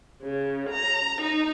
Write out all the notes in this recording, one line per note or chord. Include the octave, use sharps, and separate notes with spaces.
C#3
A#5
D#4